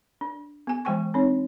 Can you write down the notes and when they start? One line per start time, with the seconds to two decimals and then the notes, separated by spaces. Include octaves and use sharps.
0.21 D4
0.67 B3 G#5
0.85 E3 G#3 C5 G5 G#5 C#6
1.14 C4 D4 D#4 C#5